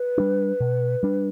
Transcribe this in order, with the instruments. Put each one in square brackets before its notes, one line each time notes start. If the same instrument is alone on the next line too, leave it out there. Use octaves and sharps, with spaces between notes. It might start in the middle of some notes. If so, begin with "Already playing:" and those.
Already playing: [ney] B4
[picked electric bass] G3 D4
B2
G3 D4